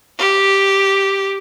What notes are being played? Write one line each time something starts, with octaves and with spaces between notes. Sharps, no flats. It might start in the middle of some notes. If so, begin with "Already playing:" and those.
G4